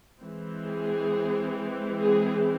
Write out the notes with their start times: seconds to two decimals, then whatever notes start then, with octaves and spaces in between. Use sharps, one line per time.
0.21 E3 G#3 C4
0.66 G#4
1.99 G#4